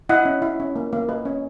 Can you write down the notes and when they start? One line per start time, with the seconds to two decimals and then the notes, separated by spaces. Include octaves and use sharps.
0.09 E4 D#5 F#5
0.25 C#4
0.42 E4
0.60 C#4
0.76 A#3
0.93 A#3
1.09 A#3 B4 D#5
1.25 C#4